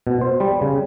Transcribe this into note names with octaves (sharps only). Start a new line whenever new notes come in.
B2
C5
G3
C#3